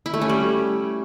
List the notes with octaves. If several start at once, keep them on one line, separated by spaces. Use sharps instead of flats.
E4
A3
C#4
G3